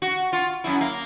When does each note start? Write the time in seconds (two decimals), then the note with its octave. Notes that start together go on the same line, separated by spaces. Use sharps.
0.02 F#4
0.33 F4
0.64 F#2 A2 E4
0.81 A#3